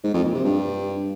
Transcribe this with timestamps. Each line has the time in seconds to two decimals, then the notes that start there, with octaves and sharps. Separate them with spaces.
0.04 G#2
0.14 F2
0.24 A#2
0.35 C3
0.45 G2